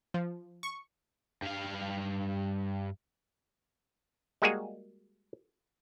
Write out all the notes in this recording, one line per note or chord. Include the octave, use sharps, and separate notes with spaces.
F3
C#6
G2 F5
G3 G#3 A#3 F#4 G#4